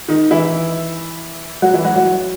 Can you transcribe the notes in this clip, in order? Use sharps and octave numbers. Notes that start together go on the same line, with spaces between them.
D#3 D#4
E3 E4
F#3 F#4
E3 E4
F#3 F#4
F#3 F#4